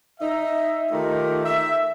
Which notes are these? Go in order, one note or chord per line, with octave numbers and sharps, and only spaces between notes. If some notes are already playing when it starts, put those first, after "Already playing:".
D#4 E5
D#3 A3 D#4 F4 G4 A#4
E5